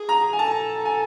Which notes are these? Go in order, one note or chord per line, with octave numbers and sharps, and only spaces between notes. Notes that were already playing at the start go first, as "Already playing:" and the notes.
Already playing: G#4
A#5
G#5
A4 A5
G#5